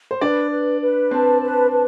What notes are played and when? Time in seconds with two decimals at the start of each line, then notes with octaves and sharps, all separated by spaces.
0.11 C5
0.21 D4 B4 D5
0.51 B4
0.81 B4
1.11 C4 C5 A5
1.42 B4
1.71 B4